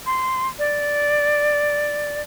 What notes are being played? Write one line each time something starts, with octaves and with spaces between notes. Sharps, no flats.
C6
D5